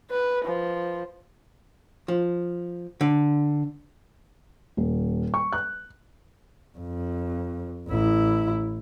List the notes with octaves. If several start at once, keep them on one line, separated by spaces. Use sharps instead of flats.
B4
F3
F3
D3
D#1
C#6
F#6
F2
A1 E4